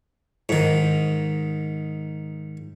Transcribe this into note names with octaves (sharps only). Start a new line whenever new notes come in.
G#2 D#3